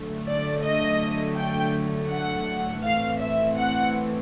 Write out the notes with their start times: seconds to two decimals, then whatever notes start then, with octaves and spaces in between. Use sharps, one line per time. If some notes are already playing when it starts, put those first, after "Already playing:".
Already playing: D3 F#3 A3
0.29 D5
0.65 D#5
1.38 G5
2.11 F#5
2.84 A2 E3 A3 C4 F5
3.21 E5
3.57 F#5